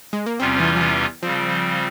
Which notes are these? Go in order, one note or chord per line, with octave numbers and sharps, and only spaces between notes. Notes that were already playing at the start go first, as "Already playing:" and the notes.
G#3
A#3
E2 C3 G3 C4 C#4 F4
E3
F3
E3
C#3 F3 G3 C4